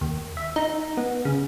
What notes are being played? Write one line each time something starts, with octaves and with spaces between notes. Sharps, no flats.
D#2
E5
D#4
B3
C#3